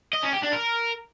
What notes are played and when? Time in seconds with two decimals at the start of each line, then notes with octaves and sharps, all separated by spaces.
0.13 D#5
0.23 C#4
0.33 G4
0.43 D4
0.53 A#4